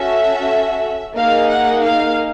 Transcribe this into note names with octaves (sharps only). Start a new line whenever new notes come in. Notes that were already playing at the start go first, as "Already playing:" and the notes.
Already playing: C#4 F#4 A4 E5
A#3 D#4 G#4 F5
F#5
F5